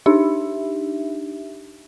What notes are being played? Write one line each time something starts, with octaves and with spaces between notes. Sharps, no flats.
D4 D#4 G4 E5